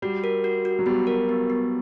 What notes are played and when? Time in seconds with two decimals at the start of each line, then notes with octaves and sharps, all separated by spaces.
0.02 G3 F#4
0.24 A#4
0.44 F#4
0.65 F#4
0.79 F#3
0.86 G3 B3
1.07 A#4
1.29 B3
1.50 B3